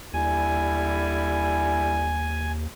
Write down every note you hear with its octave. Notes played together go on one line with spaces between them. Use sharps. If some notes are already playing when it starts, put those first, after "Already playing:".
D#2 D3 G3 E4 G#5